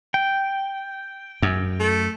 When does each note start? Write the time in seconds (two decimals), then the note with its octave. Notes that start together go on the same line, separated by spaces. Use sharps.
0.14 G5
1.42 F#2
1.80 A3